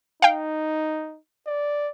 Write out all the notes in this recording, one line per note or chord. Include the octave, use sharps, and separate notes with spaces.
D#4 F5 G5
D5